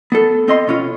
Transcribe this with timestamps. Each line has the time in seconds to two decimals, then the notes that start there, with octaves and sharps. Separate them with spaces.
0.12 B3 A4
0.48 C4 D#5 C6
0.68 B2 C#4 F4